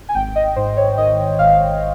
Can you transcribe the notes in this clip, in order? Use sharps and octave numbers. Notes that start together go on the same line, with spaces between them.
G#5
G#1 G5
D#5
G#2 C5
C#5
D#3 D#5
G#1 F5